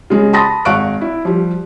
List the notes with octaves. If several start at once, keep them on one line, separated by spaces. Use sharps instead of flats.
C#3 G#3
A5 B5 C6 D#6 A6 A#6
G#1 F5 F#5 C#6 F#6 D7
E4
F3 G3